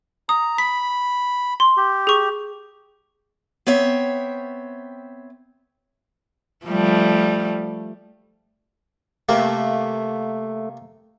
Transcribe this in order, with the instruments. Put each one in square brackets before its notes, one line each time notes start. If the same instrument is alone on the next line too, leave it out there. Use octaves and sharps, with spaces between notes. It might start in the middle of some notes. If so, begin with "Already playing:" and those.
[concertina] A#5 [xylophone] D#6
[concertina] B5 [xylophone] B6
[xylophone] C6
[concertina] G4
[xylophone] G#4 C#6
[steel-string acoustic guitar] B3 C4 C#5 E5
[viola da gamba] F3 G3 A3
[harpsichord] C3 A#3 [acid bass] A3